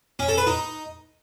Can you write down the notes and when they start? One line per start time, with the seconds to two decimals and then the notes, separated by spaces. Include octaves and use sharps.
0.19 C#4
0.28 A4
0.38 B4
0.47 D#4